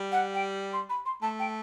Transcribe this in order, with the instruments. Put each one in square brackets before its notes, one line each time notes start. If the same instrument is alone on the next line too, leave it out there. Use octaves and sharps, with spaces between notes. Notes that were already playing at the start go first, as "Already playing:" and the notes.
Already playing: [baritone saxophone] G3
[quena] F#5
G5
C6
B5
C6
[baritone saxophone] A3 [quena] A5
[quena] G5